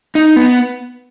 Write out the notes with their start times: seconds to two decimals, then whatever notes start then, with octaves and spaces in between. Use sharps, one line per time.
0.15 D#4
0.36 B3